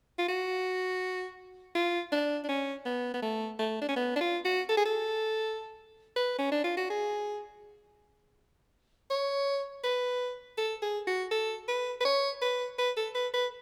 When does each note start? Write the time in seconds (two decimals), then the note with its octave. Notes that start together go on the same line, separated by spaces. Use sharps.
0.18 F4
0.28 F#4
1.75 F4
2.12 D4
2.44 D4
2.48 C#4
2.85 B3
3.14 B3
3.22 A3
3.59 A3
3.82 D4
3.89 C#4
3.96 B3
4.16 D4
4.21 F4
4.45 F#4
4.69 A4
4.77 G#4
4.85 A4
6.16 B4
6.39 C#4
6.52 D4
6.64 F4
6.77 F#4
6.90 G#4
9.10 C#5
9.84 B4
10.58 A4
10.82 G#4
11.07 F#4
11.31 A4
11.68 B4
12.00 B4
12.05 C#5
12.41 B4
12.78 B4
12.97 A4
13.15 B4
13.33 B4